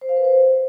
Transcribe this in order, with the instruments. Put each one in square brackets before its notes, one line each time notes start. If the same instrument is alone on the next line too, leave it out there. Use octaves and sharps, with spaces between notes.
[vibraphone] C5
F5
B4
C5